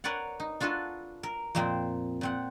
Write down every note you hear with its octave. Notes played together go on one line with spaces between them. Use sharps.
A#4 B4 C#5 D5 F#5
D#4
D4 F4 F#4 A4 B4
A#4
F2 A#2 A#3 C4 C5
A#2 C4 F#5